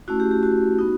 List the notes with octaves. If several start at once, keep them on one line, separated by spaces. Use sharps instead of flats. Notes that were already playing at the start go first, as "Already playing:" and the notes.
A3 C#4 E4 F#4
G4
G4
F#4
B3 D#4